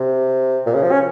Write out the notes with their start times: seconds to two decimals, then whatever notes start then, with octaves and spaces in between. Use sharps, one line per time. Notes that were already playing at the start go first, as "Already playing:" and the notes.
Already playing: C3
0.66 A#2
0.74 C#3
0.83 F3
0.91 C#4